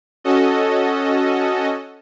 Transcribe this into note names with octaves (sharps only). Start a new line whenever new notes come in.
C#4 F#4 A4 D#5